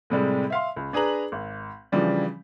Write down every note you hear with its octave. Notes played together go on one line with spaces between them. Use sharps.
A2 C3 G3 G#3
E5 F5 C6
C#2
D4 G#4 B4 A#5 F#7
G#1
C#3 E3 F3 G3 D4